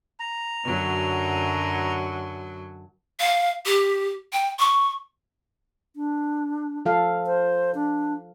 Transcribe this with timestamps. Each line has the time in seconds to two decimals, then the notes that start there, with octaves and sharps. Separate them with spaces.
0.20 A#5
0.64 F#2 D3 F#3
3.20 F5
3.66 G4
4.33 G5
4.59 C#6
5.95 D4
6.85 F3 A4 F5
7.26 C5
7.75 D4